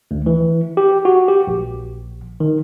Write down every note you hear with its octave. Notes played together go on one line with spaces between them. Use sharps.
D2
E3
G4
F#4
G4
A#1
D#3